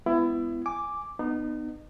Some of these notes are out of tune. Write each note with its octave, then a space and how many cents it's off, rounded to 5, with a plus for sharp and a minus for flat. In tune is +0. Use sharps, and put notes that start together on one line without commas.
G#3 +0 B3 +20 E4 +25
G#5 +0 D6 +0
B3 +0 D#4 -30